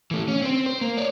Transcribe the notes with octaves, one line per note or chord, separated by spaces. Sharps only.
E3 A3
C#4
C4 C5
C5
A#3
C#5 D5